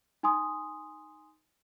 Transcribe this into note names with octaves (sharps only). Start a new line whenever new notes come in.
D#4 G#5 C6 D#6